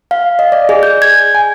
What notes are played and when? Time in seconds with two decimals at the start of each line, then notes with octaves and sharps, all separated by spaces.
0.11 F5
0.39 D#5
0.52 D5
0.69 G#4
0.83 G6
1.02 G#6
1.35 G#5